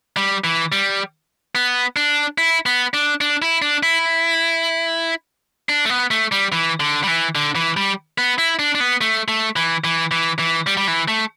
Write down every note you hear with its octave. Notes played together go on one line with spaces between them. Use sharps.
G3
E3
G3
B3
D4
E4
B3
D4
D4
E4
D4
E4
D4
A3
B3
A3
G3
E3
D3
G3
E3
D3
E3
G3
B3
E4
D4
D4
B3
A3
A3
E3
E3
E3
E3
G3
G3
E3
A3